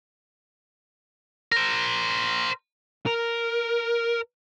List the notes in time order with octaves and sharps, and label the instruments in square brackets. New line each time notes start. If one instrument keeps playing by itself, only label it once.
[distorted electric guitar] A#4 C5
A#4